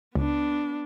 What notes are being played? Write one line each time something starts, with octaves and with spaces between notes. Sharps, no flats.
C#2 B3 D4